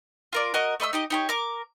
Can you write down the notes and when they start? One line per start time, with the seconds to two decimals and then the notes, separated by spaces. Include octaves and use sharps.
0.33 F4 A#4 D5
0.54 F#4 A#4 D#5
0.80 A3 D#5 B5 E6
0.93 D#4 G4 D#5
1.10 D#4 G4 C#5
1.29 A#4 D6